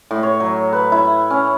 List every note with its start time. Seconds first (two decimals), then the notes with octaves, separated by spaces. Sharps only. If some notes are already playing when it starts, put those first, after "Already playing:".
0.11 A2
0.23 C#5
0.40 F#3
0.73 B4
0.92 E4
1.30 C#4